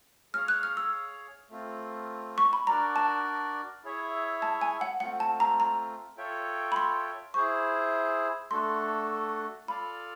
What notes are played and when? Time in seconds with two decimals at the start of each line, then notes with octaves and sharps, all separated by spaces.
0.33 G#4 C#5 F5 F6
0.48 F#6
0.63 F6
0.77 E6
1.50 A3 C4 F4
2.38 C#6
2.53 B5
2.67 D4 F#4 A#4 D5 A#5
2.96 A5
3.84 E4 G#4 C#5 E5
4.42 A5
4.61 G#5
4.81 F#5
5.00 A3 C4 F4 F#5
5.20 A5
5.40 A#5
5.60 A#5
6.17 F4 A4 C#5 E5 G5
6.72 B5
6.76 C6
7.34 E4 G#4 C5 C#6
8.51 A3 D4 F#4 A4 C6
9.68 F4 A4 D5 F5 B5